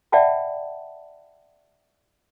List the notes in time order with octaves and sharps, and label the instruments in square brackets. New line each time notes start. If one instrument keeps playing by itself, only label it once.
[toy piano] D5 E5 F#5 G5 A5 B5